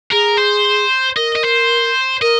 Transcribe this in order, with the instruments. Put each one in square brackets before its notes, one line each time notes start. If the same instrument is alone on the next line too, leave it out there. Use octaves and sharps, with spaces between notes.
[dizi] G#4 [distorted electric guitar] A#4
[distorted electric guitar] C5
[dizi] A#4 [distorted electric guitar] D#5
[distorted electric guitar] D#5
C5
[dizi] A#4 [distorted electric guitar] D#5